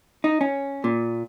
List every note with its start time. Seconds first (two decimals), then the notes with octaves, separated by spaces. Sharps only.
0.24 D#4
0.41 C#4
0.84 A#2